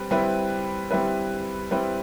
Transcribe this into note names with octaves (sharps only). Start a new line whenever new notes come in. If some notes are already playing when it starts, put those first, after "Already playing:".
Already playing: G3 C4 B4
G3 C4 E4 B4
G3 C4 E4 B4
G3 C4 E4 B4